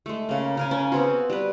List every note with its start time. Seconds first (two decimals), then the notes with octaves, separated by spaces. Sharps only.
0.06 G#3 A3
0.29 C#3 A#3
0.57 C#3 A#4 G#5
0.71 C#4
0.92 B3 C4 F#4
1.30 G3 B4